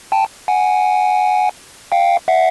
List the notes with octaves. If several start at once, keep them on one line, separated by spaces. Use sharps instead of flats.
G5 A5
F#5 G#5
F5 G5
E5 F#5